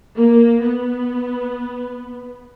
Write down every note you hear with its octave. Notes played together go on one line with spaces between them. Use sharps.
A#3
B3